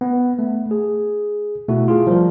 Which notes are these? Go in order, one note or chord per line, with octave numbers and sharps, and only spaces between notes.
B3
A3
G#4
B2 A3 E4 F#4
F4 G#4
F3 G3 A#4